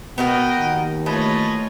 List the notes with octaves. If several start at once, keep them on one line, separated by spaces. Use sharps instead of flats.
B2 B3 F#4 A#4 B4 D#5 F#5 G5
D#2
E3 A3 F4 C#5 D#5 A5 B5